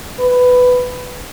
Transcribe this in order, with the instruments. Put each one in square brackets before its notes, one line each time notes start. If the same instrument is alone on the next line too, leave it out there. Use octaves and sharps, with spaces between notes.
[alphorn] B4